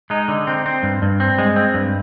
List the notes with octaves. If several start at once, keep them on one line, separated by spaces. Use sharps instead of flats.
G#3 D#4
D3
C4
C4
G2
G2
C4
G#3
C4
G2